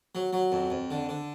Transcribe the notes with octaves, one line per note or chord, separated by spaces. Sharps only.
F#3
F#3
F2
F2
D3
D3